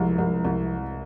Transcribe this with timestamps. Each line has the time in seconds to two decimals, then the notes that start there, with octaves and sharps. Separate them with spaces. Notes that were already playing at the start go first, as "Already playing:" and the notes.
Already playing: C2 F3 G#3
0.18 C2
0.45 C2